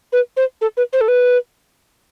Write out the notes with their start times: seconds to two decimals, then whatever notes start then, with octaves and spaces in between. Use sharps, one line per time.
0.12 B4
0.37 C5
0.61 A4
0.77 B4
0.93 C5
1.01 A4
1.08 B4